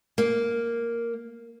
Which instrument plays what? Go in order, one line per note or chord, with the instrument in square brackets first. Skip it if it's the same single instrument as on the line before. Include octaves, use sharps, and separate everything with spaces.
[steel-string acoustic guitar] A#3